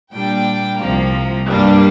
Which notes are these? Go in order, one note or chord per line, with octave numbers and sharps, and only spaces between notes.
A#2 G3 D4 G5
C2 C3 F3 A#3
G2 G3 A#3 D4